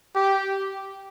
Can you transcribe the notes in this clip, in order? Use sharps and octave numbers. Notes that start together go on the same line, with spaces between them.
G4